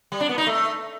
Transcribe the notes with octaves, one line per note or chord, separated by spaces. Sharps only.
G3
D4
B3
D#4
A3